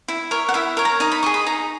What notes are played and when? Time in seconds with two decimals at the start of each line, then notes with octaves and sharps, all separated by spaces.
0.08 E4
0.31 A#4 C#5
0.49 F#5
0.54 E4 E5
0.77 A#4 C#5
0.85 A#5
1.00 D#4 A#5
1.12 B5
1.23 G#4 D#5 C#6
1.34 B5
1.46 D#4 A#5